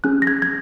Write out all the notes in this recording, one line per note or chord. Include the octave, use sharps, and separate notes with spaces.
C#4 G#4 F#6
A#6
G#6
G#6